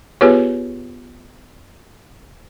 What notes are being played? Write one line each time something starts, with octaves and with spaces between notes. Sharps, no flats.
B3 F4 G4 G#4 B4 C#5